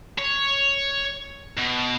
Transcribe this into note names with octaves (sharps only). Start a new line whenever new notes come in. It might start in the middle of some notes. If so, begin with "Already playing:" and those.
C#5
B2